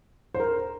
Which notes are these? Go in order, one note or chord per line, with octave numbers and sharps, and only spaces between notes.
C5
A#4